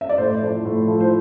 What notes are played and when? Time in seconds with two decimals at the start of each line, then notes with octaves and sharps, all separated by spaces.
0.01 E5
0.09 D5
0.18 A2 C5
0.41 F3 A3 E4
0.65 A2
0.88 F3 A3 E4
1.00 C5